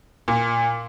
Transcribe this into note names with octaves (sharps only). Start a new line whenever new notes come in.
A#2